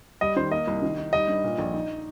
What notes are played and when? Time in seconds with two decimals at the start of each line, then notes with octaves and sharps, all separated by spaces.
0.21 G3 D#5
0.36 D#3 C5
0.51 A#3 D#5
0.67 C2
0.82 D#3
0.98 D#4
1.13 G3 D#5
1.28 G2
1.44 A#2
1.58 A#1
1.74 D#4